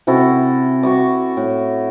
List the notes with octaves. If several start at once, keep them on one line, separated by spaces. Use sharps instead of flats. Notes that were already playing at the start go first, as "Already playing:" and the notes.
C3 E4 F#4 A4
F#4 C#6 D6
A2